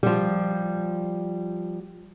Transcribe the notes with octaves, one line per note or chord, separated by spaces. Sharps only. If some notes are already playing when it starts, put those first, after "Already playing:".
F3 G3